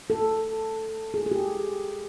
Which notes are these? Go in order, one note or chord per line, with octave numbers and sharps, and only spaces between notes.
A4
G#4
G#4
G4